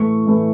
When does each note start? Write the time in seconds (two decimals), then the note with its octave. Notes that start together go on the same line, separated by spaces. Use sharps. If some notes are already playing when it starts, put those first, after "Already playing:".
Already playing: A2 E3 A3 C#6
0.27 A2 E3 A3